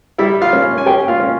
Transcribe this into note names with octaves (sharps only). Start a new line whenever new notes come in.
G3 E4 E5
F4 F5
C#4
G#5
C#4 G4 G5
F4 F5
C#4